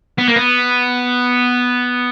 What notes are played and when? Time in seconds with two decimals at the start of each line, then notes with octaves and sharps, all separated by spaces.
0.18 B3
0.27 A#3
0.36 B3